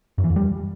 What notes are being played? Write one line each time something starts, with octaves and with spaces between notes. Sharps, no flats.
F#2
E3
F2
G3